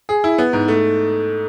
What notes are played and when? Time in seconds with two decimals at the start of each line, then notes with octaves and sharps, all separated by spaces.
0.09 G#4
0.24 E4
0.38 B3
0.53 G#2
0.68 A3